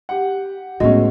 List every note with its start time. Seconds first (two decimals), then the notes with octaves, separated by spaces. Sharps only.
0.09 G4 F#5
0.80 A2 C#3 G#3 A3 B3 C#4 F#4 D#5